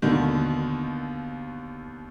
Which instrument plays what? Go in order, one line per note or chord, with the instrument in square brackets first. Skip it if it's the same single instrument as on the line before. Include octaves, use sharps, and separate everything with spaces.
[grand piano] D#2 B2 D3 D#3